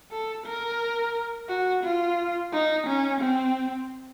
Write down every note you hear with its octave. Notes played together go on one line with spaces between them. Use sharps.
A4
A#4
F#4
F4
D#4
C#4
C4